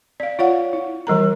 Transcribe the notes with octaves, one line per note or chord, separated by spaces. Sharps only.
D5 F5
F4 C#5 F5 F#5
E4
E3 G3 A#4 A#5